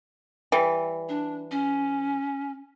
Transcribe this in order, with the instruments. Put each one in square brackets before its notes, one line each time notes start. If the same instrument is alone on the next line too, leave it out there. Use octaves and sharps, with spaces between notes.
[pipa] E3 G3
[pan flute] D4
C#4